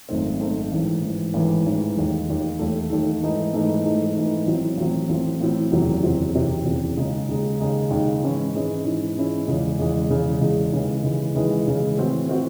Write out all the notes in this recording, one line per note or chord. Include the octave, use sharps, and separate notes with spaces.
G#1 F#2 D#3 A3 C4
G#1 F#2 D#3 A3 C4
A1 G#2 E3
A1 G#2 E3
A1 G#2 E3
A1 G#2 E3
E1 D#2 D#3 A3
E1 D#2 D#3 A3
E1 D#2 D#3 A3
E1 D#2 D#3 A3
G#2 E3 A3 D#4
G#2 E3 A3 D#4
G#2 E3 A3 D#4
G#2 E3 A3 D#4
A1 A2 F#3 C4
A1 A2 F#3 C4
A1 A2 F#3 C4
A1 A2 F#3 C4
F#1 E2 C3 F#3 C4
F#1 E2 C3 F#3 C4
F#1 E2 C3 F#3 C4
F#1 E2 C3 F#3 C4
D#2 C#3 G#3 D#4
D#2 C#3 G#3 D#4
D#2 C#3 G#3 D#4
D#2 C#3 G#3 D#4
G#2 E3 G#3 C#4 E4
G#2 E3 G#3 C#4 E4
G#2 E3 G#3 C#4 E4
G#2 E3 G#3 C#4 E4
E2 C#3 G#3
E2 C#3 G#3
E2 C#3 G#3
E2 C#3 G#3
D#2 C#3 E3 G#3
D#2 C#3 E3 G#3
D#2 C#3 E3 G#3
D#2 C#3 E3 G#3
A2 E3 C4 F#4
A2 E3 C4 F#4